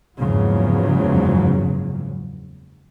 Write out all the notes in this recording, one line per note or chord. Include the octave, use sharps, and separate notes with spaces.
F#1 E2 G#2 C#3 F3 F#3